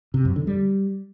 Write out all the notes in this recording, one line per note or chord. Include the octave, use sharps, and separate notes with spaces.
C3
F#2
D3
G3